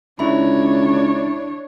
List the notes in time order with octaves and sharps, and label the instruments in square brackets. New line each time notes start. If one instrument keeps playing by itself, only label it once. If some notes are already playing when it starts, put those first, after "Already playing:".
[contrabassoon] C#2 [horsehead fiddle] D4 C#5 [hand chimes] E4 E5 B5